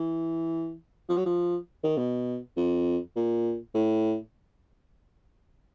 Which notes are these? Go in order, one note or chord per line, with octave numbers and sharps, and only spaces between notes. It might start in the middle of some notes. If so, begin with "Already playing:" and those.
Already playing: E3
F3
F#3
F3
D#3
B2
F2
A#2
A2